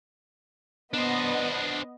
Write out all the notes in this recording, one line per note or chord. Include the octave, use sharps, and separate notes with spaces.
B3 D4 C5 D#5